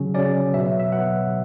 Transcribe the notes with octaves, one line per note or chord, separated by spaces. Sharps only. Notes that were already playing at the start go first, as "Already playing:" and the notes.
Already playing: C#3 F#3 C#4
C#3 F#3 C#4 D5
B2 F#3 B3 E5
E5
E5
B2 F#3 B3 F#5